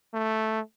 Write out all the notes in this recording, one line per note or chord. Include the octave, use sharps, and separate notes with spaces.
A3